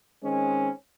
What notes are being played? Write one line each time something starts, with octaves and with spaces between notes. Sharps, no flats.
D#3 G#3 C4 C#4